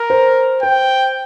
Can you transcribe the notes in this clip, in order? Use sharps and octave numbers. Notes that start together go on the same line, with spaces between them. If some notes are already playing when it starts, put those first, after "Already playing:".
Already playing: A#4
C5
C5 G5